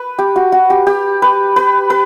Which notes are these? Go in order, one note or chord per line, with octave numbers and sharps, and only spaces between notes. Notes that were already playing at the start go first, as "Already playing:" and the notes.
Already playing: B4
G4
F#4
F#4
G4
G4
B4
B4
B4